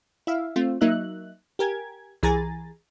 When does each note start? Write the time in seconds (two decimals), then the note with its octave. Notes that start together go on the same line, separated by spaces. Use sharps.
0.27 E4 E5 F5
0.56 A3 C4 F4
0.81 F#3 A#3 D#4 E5 F#6
1.59 G4 A#4 G#5 G#6
2.23 C2 E3 G#4 G#5 A#5 A6